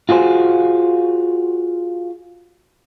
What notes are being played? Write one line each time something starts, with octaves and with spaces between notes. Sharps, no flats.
F4 F#4 G#4 C5